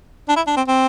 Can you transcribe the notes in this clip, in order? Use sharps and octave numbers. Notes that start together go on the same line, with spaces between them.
D4
E4
D4
C4
C4